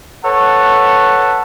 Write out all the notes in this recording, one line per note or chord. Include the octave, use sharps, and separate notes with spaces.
A4 B4 C#5 F#5 A5